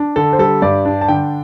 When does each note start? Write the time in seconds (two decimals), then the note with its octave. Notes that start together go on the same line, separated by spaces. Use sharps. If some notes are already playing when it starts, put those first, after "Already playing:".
Already playing: D4
0.16 D3 A4
0.33 C5
0.39 G3 A4
0.62 G2 D5
0.85 D4
1.01 A5
1.08 D3 G5